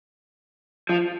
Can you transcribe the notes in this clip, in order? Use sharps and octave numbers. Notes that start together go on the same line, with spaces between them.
F3